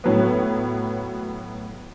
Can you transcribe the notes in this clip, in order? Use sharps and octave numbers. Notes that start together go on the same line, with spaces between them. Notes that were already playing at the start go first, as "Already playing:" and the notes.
A2 F#3 B3